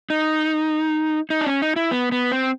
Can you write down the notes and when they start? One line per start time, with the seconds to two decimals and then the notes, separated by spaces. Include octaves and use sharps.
0.10 D#4
1.30 D#4
1.41 D4
1.47 C#4
1.62 D#4
1.76 E4
1.91 B3
2.12 B3
2.32 C4